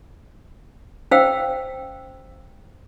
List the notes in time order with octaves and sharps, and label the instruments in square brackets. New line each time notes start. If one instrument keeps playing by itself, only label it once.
[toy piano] C#4 C5 F5 G5 E6